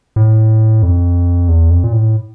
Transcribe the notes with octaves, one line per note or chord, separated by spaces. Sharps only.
A2
F2
E2
F2
A#2
A2